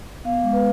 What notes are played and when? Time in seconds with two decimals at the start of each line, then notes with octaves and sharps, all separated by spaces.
0.25 B3 F5
0.43 G#3
0.53 B4